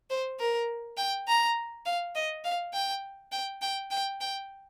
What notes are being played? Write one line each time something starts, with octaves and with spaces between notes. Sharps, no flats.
C5
A#4
G5
A#5
F5
D#5
F5
G5
G5
G5
G5
G5